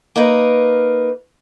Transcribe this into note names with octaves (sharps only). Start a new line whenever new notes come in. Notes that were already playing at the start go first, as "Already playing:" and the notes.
A#3 D#4 A#4 B4